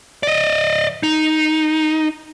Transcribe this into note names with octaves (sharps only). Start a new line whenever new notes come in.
D5 D#5
D#4